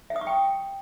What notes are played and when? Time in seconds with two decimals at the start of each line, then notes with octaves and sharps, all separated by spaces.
0.10 E5
0.16 D#6
0.21 C#6
0.27 G5